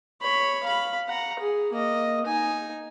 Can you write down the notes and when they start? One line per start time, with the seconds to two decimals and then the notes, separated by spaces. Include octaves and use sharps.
0.21 C#5 B5
0.64 F5 B5
1.08 F#5 A#5
1.40 G#4
1.73 A#3 D#5
2.26 D#4 G#5